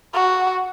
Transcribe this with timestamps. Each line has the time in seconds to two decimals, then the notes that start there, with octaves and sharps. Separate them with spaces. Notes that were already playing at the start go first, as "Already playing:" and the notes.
0.14 F#4